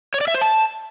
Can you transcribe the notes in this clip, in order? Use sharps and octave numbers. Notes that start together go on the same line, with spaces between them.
C#5
D5
E5
C5
A5